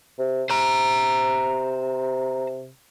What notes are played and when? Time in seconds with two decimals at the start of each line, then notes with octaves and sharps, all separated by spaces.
0.19 C3
0.50 C3 C5 A#5